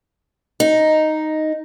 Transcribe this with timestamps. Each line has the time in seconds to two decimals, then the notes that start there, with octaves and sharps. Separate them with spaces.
0.60 D#4